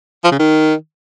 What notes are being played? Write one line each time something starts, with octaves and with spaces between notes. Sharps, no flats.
F3
C#3
D#3